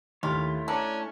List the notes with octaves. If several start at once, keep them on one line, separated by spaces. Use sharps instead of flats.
D#2 A3 E4 F4 C#5
C#4 D4 A#5